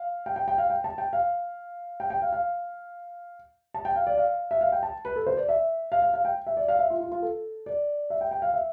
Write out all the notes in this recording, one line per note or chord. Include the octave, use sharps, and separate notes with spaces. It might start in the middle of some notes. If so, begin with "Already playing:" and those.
Already playing: F5
G5
G5
G5
F5
G5
A5
G5
F5
G5
G5
F5
F5
A5
G5
F5
D5
F5
E5
F5
G5
A5
B4
A4
C5
D5
E5
F5
F5
F5
G5
E5
D5
F5
E5
F4
F4
F4
A4
D5
E5
G5
G5
F5
E5